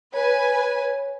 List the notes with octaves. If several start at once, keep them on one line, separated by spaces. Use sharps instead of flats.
B4 C#5 G#5